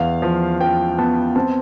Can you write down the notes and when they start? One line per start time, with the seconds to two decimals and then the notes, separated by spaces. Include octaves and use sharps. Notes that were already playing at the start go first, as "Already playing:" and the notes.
Already playing: E2 F5
0.22 F3
0.61 F3 G5
0.98 B3 A5
1.35 C4 A5